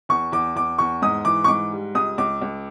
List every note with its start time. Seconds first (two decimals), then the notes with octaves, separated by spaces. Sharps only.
0.09 E2 C#6
0.32 E2 D6
0.55 E2 D6
0.78 E2 C#6
1.02 G#2 D#6
1.25 E3 D6
1.44 C#6
1.48 G#2 D6
1.72 G3
1.95 C#2 D#6
2.18 C#2 D6
2.41 C#2